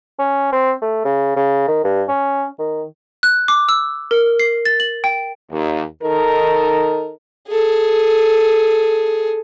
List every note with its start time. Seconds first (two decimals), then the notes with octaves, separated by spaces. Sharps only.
0.19 C#4
0.52 C4
0.82 A3
1.05 C#3
1.36 C#3
1.68 D#3
1.84 G2
2.09 C#4
2.59 D#3
3.23 F#6
3.48 D6
3.69 E6
4.11 A#4
4.40 C7
4.65 A6
4.80 F#7
5.04 G5
5.51 D#2
6.03 D#3 D#4 A4 A#4
7.48 G#4 A4